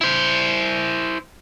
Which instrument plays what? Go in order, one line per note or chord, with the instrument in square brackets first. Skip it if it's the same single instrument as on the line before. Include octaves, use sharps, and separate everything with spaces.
[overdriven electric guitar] E4 C5